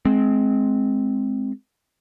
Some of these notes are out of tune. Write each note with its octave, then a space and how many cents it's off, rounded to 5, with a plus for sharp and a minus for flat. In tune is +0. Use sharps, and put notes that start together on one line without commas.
G#3 +20 C4 +0